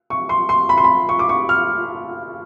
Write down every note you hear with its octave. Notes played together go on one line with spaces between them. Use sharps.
C#6
C6
C6
B5
C6
B5
C#6
D6
C#6
F6